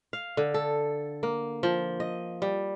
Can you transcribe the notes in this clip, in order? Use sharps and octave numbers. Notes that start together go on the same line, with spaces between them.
F5
D3
A4
A#3
F3
D#5
G3